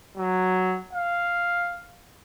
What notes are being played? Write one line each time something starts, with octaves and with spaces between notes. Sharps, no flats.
F#3
F5